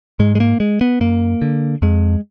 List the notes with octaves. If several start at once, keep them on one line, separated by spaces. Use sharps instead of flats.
G#2 G#3
G#3
A#3
G#3
B3
F#2 A#3
D3
F2 G#3